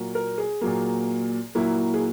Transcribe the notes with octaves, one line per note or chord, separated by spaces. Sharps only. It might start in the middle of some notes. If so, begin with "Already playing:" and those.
Already playing: A#2 F#3 A#3
A#4
G#4
A#2 F#3 A#3
A#2 F#3 A#3 E4
G#4